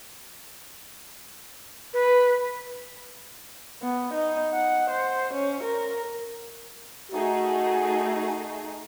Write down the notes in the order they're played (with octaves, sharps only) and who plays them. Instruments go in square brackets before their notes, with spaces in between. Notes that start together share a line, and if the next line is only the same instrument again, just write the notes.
[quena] B4
[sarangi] B3
D#4
F#5
C5
C#4
A#4
[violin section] A3 D#4 G#4 [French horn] F#4